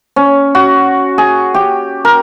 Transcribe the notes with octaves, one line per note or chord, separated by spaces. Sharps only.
C#4
F#4
G#4
G4
A#4